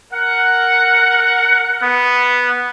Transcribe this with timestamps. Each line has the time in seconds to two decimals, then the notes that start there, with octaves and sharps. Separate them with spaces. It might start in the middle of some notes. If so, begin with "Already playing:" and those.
0.12 A#4 F#5
1.83 B3